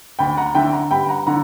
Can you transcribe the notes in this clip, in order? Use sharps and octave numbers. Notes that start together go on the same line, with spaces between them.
D2 G5 B5
F#5 A#5
D3 E5 G5
F#5 A#5
G2 G5 B5
F#5 A#5
D3 F#5 A#5